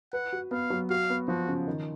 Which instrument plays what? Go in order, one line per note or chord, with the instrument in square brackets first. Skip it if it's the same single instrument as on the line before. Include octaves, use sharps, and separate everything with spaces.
[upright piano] B4 [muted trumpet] F#5
[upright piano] F#4
[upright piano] B3 [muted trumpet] F5
[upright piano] F#3
[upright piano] F#4 [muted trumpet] F5
[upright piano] B3
[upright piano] F3 [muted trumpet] F#4
[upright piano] C#3
D#3